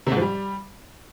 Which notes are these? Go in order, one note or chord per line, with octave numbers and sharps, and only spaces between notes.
C3
G#2
F3
G3